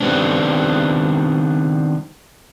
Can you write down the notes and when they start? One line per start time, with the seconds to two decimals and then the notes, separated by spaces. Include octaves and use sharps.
0.01 D#3 G3 B3 C4 D4